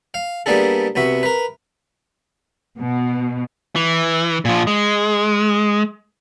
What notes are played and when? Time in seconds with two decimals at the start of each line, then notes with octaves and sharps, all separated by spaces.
0.14 F5
0.46 G3 A#3 B3 D4 G#4 A4
0.96 C2 B3 F#4 E5
1.23 A#4 B4
2.79 B2
3.76 E3
4.45 A#2 F3
4.67 G#3